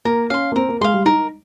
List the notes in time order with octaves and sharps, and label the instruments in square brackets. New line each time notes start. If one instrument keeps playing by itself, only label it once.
[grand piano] A#3 [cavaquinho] A#4
[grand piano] C#4 [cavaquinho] F5 C6
[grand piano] A#3
[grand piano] C4 [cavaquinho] A#4
[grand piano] A#3
[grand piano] G#3 [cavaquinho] F5 C6
[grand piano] G3
[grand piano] D#4 [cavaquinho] A#4